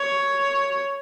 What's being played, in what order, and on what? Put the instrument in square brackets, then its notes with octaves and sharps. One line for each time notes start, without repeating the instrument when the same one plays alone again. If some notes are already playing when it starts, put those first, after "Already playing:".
Already playing: [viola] C#5